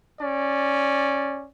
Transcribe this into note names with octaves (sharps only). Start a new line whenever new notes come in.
C#4 D5